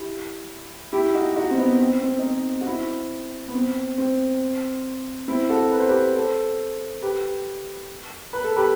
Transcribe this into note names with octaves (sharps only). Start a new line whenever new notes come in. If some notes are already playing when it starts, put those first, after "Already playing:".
Already playing: E4 G4
E4 G4
D#4 F#4
D#4 F#4
C4
B3 D#4
C4
C4
D#4
C4
F#4
C4 E4
B3
C4
C4
C4 E4
F#4 A4
B4
C5
G4 B4
A4 C5
G4 B4
B4
A4
G4 B4